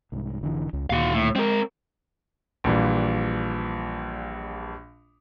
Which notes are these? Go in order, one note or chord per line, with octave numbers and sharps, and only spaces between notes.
C2 G#2
F1 D3 E3
C#2
D2 A#2 D#3 F#4 F5
A2
G#3 C4 A#4
A#1 A#2 E3 G3